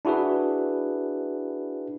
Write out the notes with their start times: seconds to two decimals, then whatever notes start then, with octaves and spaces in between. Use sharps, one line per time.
0.05 D4 E4 F#4 G#4 B4